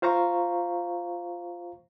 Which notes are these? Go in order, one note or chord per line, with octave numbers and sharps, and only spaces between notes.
F4 C5 F5 A#5 C#6